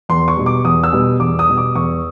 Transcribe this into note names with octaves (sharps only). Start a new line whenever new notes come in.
E2 C6
C#6
B2 G3
D6
E2 D#6
E6
B2 G3
E2 D6
D#6
B2 G3
D6
E2 C#6